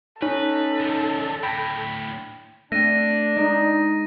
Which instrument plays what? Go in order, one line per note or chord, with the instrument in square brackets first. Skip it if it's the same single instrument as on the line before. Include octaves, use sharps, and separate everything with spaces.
[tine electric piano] C#4 [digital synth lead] D#4 [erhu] A4 [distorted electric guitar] B4
[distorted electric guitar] D3 F3
[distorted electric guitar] D2 A2 [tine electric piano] G5 A#6 [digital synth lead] B5
[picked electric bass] A3 C4 [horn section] D4 [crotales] A#6 D#7
[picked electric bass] G#3 [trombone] D#4